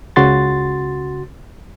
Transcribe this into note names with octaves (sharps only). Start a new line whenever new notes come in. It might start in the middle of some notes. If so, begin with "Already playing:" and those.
C#2 C#3 F#4 C6 A6